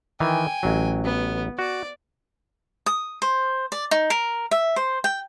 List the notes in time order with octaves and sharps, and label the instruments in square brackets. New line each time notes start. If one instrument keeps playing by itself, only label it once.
[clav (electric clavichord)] D#3 E3 [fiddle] G5 G#5
[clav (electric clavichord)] A1 F#3
[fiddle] B3
[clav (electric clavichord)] F#4 [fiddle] D5
[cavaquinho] D#6
C5
D5
D#4
A#4
E5
C5
G5